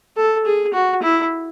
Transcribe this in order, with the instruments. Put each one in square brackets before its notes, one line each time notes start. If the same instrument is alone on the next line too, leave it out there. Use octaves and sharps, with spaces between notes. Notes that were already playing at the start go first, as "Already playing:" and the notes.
[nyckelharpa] A4
G#4
F#4
E4